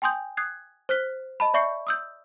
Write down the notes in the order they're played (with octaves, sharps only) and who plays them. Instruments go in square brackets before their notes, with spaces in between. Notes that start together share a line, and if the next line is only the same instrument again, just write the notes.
[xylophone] G5 G#5 C6 D#6 G6
D#6 F#6 G#6 C7
C5 F6 F#6 B6 G7
D#5 A5 B5
D5 E5 C#6 G6 C7 C#7
D#6 E6 G6